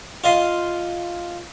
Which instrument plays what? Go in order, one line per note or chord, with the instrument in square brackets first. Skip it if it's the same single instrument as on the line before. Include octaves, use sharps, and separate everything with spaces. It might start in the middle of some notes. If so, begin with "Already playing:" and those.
[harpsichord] F4 D#5 C6